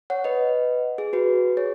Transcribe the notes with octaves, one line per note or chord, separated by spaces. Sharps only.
C#5 F#5
B4 D#5
G#4
F#4 B4
G#4 C#5